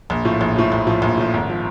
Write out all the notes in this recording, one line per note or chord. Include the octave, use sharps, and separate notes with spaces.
A#1
A2 F3
A#1
A2 F3
A#1
A2 F3
A#1
A2 F3
G#1
F3